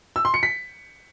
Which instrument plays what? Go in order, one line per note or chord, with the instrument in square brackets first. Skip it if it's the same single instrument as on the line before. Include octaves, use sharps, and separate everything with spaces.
[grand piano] E6
C6
C#7
B6